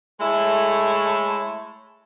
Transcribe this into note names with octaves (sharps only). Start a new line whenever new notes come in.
G#3 A3 E4 A4 C#5